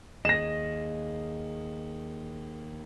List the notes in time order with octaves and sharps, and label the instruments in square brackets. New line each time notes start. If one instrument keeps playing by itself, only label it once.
[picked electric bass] D#2 [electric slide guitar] G#4 D#5 [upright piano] A#6 E7